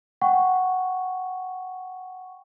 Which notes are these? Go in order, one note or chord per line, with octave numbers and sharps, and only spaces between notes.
F#5 G5 C#6